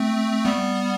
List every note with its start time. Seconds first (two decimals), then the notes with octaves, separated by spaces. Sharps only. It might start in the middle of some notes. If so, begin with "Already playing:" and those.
Already playing: A3 C4
0.45 G3 B3